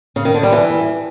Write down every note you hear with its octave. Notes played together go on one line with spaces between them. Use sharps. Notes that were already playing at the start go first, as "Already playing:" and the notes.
C#3
D#3
D3
G3
E3